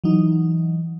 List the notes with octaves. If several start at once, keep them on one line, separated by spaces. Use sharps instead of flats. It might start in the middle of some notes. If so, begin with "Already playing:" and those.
E3 F#3 D#4